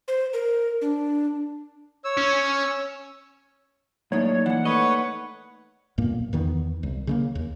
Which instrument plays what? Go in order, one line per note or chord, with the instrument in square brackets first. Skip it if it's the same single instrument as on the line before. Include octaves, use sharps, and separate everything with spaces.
[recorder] C5
A#4
D4
[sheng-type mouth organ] C#5 E6
[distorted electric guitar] C#4
[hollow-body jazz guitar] F#2 A2 [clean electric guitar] A#3 D#4 D5 [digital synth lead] C#5
[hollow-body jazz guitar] A#2 E3 [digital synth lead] F#5
[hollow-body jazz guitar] A3 D#5 [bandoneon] B4 C#5
[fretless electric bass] B1 G2 A#2 A#3
E2 D#3 B3
C2
C#3 G#3 A#3
D#2